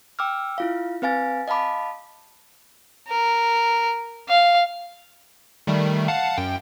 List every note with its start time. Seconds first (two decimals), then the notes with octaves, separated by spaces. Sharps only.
0.19 G5 D6 E6 F6
0.58 E4 F4 F5
1.02 C4 B4 F5 G#5 A6
1.48 D#5 F5 A5 B5 D6
3.08 A#4
4.29 F5
5.67 D#3 G3 A3
6.08 F5 F#5 A5
6.38 F#2 G5